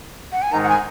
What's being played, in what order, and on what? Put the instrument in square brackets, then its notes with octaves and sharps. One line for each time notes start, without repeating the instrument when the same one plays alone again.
[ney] F#5
G#5
[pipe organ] G#2 D#3 G#3 D#4 [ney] A#5
[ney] F#5
G#5